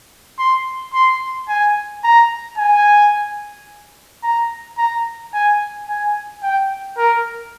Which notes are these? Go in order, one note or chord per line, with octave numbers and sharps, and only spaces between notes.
C6
C6
G#5
A#5
G#5
A#5
A#5
G#5
G#5
G5
A#4